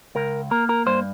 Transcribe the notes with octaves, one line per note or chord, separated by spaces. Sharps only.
C#2 A#4
A#3 A#4
A#4
G2 C5